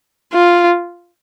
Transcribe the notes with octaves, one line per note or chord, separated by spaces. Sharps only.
F4